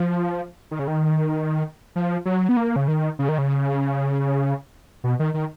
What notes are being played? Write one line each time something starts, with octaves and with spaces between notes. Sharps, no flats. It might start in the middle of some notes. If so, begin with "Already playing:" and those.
Already playing: F3
D#3
C#3
D#3
F3
F#3
B3
A#3
C#3
D#3
C#3
D#3
C#3
B2
D#3
D#3